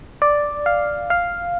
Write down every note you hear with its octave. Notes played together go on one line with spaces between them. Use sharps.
D5
F5
F5